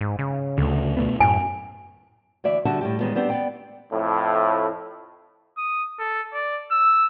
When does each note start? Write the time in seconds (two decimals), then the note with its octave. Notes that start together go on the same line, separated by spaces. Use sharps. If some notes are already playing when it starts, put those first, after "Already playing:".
0.01 G#2
0.19 C#3
0.58 D2 C#3 A3
0.97 B2 A3 B3
1.20 F#2 A2 G#5
2.44 D2 E3 D5 E5
2.65 D3 G3 F#4 E5 F#5 A5
2.81 A2 G3 G4
3.00 A2 D#3 E3 G3 G#3 B3
3.15 G3 B3 C4 D4 G4
3.30 B3 D5 G5
3.93 F2 A2
5.58 D#6
5.99 A4
6.33 D5
6.71 E6